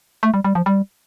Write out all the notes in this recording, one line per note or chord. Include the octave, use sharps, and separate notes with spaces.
A3
G3
G3
F3
G3